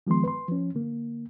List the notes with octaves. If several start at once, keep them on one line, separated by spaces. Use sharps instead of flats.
D#3 F3 G#3 B3 C6
B4 C6
F3 C#4
D3 A#3